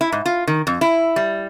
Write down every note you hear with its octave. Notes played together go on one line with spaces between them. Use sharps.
E4
G#2
F4
D#3
F2
E4
G3